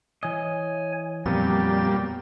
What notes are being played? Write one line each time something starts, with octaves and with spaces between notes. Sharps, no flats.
E3 C#5 D#5 G#5
F2 A#2 F#3 G3 B3 A6